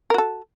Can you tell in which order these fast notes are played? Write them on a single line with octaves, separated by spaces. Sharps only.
A#4 F#4 A4